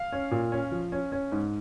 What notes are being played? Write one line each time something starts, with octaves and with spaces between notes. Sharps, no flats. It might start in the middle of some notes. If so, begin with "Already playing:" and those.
Already playing: F5
C#4
A#2
C#4
F3
C#4
C#4
G#2